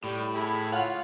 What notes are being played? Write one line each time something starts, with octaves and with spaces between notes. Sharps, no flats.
A2 G3
G#4 E5 B5
F4 C#5 F5 F#5